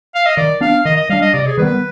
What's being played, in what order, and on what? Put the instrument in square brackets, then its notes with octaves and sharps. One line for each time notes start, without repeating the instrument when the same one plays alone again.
[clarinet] F5
D#5
[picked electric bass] D#3 [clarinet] D5
[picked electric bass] B3 D4 [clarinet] F5
[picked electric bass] D#3 [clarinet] D#5
[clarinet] D#5
[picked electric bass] G3 D4 [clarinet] F5
[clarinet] D#5
[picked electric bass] C3 [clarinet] D5
[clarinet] G#4
[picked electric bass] D#3 G3 B3 [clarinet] B4